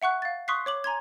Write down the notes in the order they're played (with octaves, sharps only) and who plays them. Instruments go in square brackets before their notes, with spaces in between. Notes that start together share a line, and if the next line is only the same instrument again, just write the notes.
[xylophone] E5 F#5 C#6 F#6
F5 A6
C6 C#6 D#6 F#6 B6 C7
C#5 D6 F#7
G#5 A#5 C6 G#6